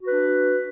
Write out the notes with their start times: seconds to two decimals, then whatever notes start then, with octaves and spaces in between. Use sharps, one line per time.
0.01 F#4
0.06 B4
0.10 D4